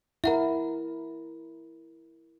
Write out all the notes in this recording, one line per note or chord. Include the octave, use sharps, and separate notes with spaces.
E4 A#4 E5 F#5 A#5